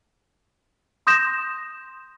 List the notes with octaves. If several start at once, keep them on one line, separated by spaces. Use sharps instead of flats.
C6 D#6 G6 A#6 E7